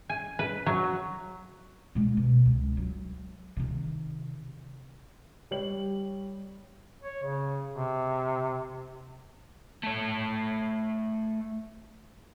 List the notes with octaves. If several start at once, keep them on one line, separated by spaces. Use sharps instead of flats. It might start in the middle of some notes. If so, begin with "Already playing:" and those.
G#5
B4
F#3
A#2 G#3
B2
C#2
F#3
C3 D#3
G3 C#5 F#7
C#5
C#3
C3
A3 C#5